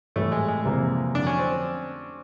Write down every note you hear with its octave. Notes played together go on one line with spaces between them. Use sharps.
A2 E3 G3 A3
G#3
G#3
F2 C3 E3 G3 A#3
F2 D3 F#3 D4
C#4
C4